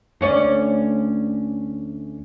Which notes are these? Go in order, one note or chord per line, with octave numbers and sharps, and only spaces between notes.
D2 C#4 D5